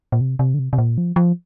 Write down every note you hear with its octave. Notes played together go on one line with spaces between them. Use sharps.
A#2
C3
C3
D3
C3
C3
A#2
F3
F3